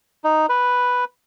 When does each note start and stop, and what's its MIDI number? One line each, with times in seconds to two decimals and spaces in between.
0.24 0.46 63
0.49 1.04 71